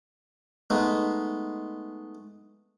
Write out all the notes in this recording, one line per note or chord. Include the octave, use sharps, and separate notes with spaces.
G#3 A3 B3 D#4